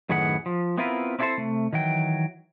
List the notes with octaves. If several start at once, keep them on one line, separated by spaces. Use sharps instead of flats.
F#2 A2 D#3 G#4 B4 F#5
F3
B3 C4 E4 F4 A#4 B4
C4 D4 E4 G#4 A4 C5
C3 A3
D#3 E3 F#3 G5